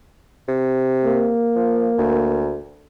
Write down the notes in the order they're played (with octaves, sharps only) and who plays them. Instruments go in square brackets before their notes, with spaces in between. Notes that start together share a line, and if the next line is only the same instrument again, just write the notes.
[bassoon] C3
[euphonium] A#3
[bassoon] F3
D2